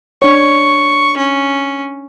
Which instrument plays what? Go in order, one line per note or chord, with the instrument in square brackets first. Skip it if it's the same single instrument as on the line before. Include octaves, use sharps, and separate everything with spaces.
[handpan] D4 C#5 [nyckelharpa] C#6
[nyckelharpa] C#4